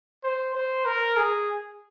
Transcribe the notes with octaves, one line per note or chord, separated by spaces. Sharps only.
C5
C5
A#4
G#4